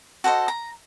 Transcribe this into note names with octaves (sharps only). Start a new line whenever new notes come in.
F#4 A4 C5 D#5
A#5